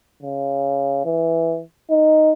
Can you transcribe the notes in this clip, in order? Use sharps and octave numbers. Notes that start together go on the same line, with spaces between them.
C#3
E3
D#4